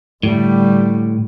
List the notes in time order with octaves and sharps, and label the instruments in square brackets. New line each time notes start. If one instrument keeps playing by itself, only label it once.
[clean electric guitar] A2 [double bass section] D3 G3 A3